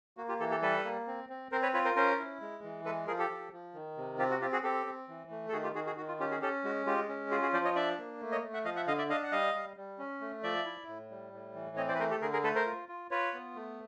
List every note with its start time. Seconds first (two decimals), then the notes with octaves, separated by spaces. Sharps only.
0.17 A#3 F#4
0.29 F4 G4
0.40 E3 G4 A4
0.51 G4 A4
0.62 G3 A4 B4
0.85 A#3
1.07 C4
1.29 C4
1.52 C4 A#4 C5
1.63 B4 C#5
1.74 F4 B4 C#5
1.85 A#4 C5
1.96 C#4 A#4 C5
2.18 E4
2.41 G#3
2.63 E3
2.85 G#3 A4 B4
3.07 F3 G#4 A#4
3.19 G4 A4
3.30 F3
3.52 F3
3.74 D#3
3.97 C3
4.18 C4 F4 G4
4.31 F#4
4.41 C4 F4 G4
4.52 F#4 G#4
4.63 C4 G4 A4
4.86 C4
5.08 E3
5.31 A3
5.49 A4
5.52 D#3 F#4 G#4
5.63 F4 G4
5.75 D#3 F#4 G#4
5.86 F#4 G#4
5.97 D#3 F#4
6.08 F4
6.20 C#4 F4 G4
6.31 F#4 G#4
6.42 C#4 G4 A4
6.64 G#3 F#4
6.86 G#3 F4 G4
7.09 C#4
7.31 F4 F#4 G#4
7.42 F#4 G#4
7.53 F3 C5 D5
7.65 C#5 D#5
7.76 D4 D5 E5
7.98 A#3
8.21 A3
8.32 C#5 D#5
8.43 A3
8.54 E5 F#5
8.65 F3 D#5 F5
8.76 E5 F#5
8.87 D3 D#5 F5
8.98 D5 E5
9.10 D4 D#5 F5
9.23 F#5
9.32 G3 D#5 F5
9.54 G3
9.76 G3
9.99 C#4
10.21 A3
10.43 F3 D5 E5
10.65 E4
10.88 A2
11.10 G3
11.33 A2
11.55 E3
11.77 C4 C#5 D#5
11.88 C5 D5
11.95 B4
11.99 A3 A#4 C5
12.10 G4 A4
12.22 D3 G#4 A#4
12.33 G#4 A#4
12.44 A3 A4 B4
12.55 A#4 C5
12.66 F4
12.89 F4
13.11 F4 B4 C#5
13.34 B3
13.55 A3